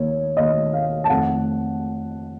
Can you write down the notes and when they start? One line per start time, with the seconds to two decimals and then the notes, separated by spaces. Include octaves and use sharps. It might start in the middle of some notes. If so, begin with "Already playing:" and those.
Already playing: D#2 D#3 A#3 C#5
0.37 D#2 D#3 A#3 D#5
0.73 F5
1.04 A5
1.10 F2 D#3 A3 F#5